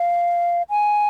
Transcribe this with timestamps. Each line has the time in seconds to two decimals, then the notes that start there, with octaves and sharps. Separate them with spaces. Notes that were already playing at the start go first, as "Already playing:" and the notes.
Already playing: F5
0.70 G#5